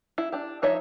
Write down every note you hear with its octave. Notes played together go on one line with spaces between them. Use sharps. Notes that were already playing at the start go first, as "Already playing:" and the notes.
E4
D4 G4
F3 D#4 C#5 E5